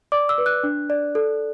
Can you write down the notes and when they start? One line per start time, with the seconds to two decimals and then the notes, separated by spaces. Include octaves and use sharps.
0.12 D5 D6
0.29 E6
0.38 B4
0.46 F#6
0.64 D4
0.90 D5
1.15 A4